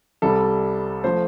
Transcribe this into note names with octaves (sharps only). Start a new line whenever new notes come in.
C2 C3 G3 A4
F3 A3 C5